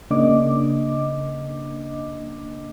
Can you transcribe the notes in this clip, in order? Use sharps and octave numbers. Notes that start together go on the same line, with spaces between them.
C#3 A#3 D4 D#5 D6